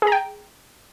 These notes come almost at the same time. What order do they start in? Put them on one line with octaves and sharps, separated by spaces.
G#4 A#5 G5